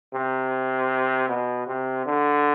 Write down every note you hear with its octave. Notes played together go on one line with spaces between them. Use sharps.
C3
B2
C3
D3